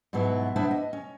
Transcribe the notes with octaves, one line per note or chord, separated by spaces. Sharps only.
G#2 B2 F#3 B3 E4
B3 D4 E4 C5 E5 F#5
D#5
C#4